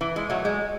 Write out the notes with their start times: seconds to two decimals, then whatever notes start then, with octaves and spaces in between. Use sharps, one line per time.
0.01 E3
0.16 G#3
0.30 F#3 A3
0.45 G#3